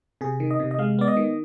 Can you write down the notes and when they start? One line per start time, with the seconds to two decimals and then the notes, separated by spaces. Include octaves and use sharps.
0.21 C3 G#4
0.40 D#3
0.51 D#5
0.60 C3
0.71 D#5
0.79 G#3 F5
0.99 B3 D5
1.08 D#5
1.17 D#3